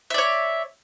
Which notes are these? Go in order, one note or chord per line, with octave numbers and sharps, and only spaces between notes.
C#5 D5 E5